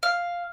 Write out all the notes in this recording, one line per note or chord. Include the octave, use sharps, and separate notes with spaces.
F5